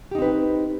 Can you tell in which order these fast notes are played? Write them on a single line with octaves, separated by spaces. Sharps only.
G4 D#4 C4 B4